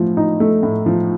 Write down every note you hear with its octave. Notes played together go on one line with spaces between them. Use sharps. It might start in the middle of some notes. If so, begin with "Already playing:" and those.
Already playing: A2 F3 A3
D#4
A3
A2
F3